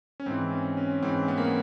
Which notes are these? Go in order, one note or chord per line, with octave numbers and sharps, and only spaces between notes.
C#4
G#2 E3 C4
C#4
C#4
G#2 E3 C4
B3
A#3
B3